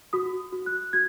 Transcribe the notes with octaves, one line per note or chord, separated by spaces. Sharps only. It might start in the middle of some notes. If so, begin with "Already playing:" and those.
F#4 D#6
F#4
F#6
F#4 G#6